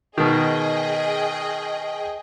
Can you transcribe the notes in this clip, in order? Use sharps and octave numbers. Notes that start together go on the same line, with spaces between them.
B2 D#3 G#4 D#5 G5